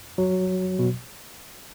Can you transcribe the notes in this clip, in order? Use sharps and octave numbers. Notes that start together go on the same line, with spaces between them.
F#3
B2